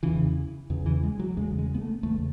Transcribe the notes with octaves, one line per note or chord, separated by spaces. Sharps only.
E2 C#3 E3
E2 C#3
E3
G#3
F#3
E2 C#3 G#3
G#3
B3
A3
E2 C#3 A3